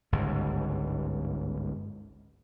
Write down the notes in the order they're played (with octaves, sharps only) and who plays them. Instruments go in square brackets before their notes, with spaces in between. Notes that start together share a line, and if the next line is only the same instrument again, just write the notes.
[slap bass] G1 C#2 G#2